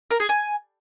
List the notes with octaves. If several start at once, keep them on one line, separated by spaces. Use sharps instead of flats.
A#4
G#4
G#5